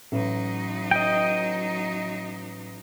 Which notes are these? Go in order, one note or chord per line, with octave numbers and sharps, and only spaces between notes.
A1 F#3 D#4
D#5 G5